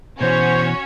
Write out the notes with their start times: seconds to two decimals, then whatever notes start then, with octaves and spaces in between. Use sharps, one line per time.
0.21 B2 E3 C#4 F#4 C5 C#5